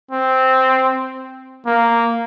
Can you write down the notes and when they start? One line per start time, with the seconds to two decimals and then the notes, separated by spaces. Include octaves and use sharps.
0.11 C4
1.66 A#3